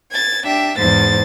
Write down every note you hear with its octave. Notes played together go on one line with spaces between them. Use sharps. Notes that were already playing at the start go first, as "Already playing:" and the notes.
G#6 A6
D4 G4 E5
E2 G#2 C5 A6